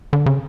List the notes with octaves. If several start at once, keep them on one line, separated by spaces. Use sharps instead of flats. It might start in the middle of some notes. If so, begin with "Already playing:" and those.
D3
C#3